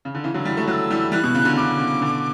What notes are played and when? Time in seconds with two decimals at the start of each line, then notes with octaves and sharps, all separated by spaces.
0.05 C#3
0.15 D3
0.24 C#3 E3
0.34 D3 F#3
0.45 E3 G3
0.57 F#3 A3
0.67 F#3 A3 F#6
0.72 E6
0.90 E3 G3
1.12 E3 G3 F#6
1.23 B2
1.35 C#3
1.45 B2 D3
1.56 C#3 D6
1.79 C#3
2.01 B2 D3